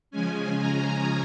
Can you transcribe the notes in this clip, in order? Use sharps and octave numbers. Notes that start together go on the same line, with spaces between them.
C#3 F3 G#3 C#4 G#5
A#5